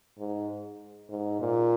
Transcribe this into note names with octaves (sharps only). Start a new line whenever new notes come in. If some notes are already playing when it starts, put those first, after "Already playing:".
G#2
G#2
A#2